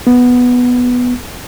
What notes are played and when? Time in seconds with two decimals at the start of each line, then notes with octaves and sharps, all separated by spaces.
0.07 B3